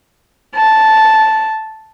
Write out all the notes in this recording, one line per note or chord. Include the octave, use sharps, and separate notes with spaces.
A5